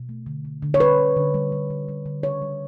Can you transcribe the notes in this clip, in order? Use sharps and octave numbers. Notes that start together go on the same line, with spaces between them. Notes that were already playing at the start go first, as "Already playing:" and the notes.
Already playing: B2
A3
D3
D3
D3
C#5
G3 B4
D3
D3
G3
G3
D3
G3
D3
C#3 C#5
G3